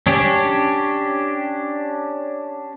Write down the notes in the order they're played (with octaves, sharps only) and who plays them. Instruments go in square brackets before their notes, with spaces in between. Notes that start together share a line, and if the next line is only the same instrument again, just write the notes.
[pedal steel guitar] C#4 D4 G4